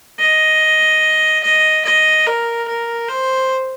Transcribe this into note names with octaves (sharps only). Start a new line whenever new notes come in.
D#5
D#5
D#5
A#4
A#4
C5